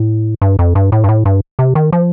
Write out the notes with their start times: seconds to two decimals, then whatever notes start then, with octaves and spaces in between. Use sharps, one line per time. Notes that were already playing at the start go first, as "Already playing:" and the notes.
Already playing: A2
0.42 G2
0.59 F2
0.75 G2
0.92 A2
1.04 G2
1.09 A2
1.26 G2
1.59 C3
1.75 D#3
1.93 F3